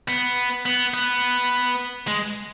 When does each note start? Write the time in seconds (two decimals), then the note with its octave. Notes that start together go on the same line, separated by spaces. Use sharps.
0.09 B3
0.66 B3
0.94 B3
2.07 G#3